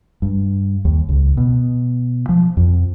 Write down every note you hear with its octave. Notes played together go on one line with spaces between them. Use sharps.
G2
D#2
C#2
B2
F3
F2